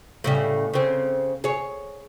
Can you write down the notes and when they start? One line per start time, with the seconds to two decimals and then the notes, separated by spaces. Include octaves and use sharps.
0.24 A2 C#3 G3
0.74 C#3 C4
1.44 G#4 C#5